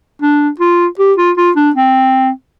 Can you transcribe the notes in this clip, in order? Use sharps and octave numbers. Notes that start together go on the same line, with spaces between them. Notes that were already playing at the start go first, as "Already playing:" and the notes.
D4
F4
G4
F4
F4
D4
C4